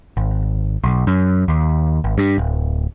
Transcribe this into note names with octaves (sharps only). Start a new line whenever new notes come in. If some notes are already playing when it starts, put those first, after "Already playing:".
G#1
B1
F#2
D#2
G#1
G2
D1